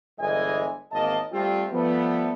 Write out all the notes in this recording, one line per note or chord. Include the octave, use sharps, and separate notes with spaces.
G1 E2 E3 G#3 D#5 G#5
G#1 E2 A#3 D#5 A5
G3 A3 C4 F4 G4
F3 G3 A3 B3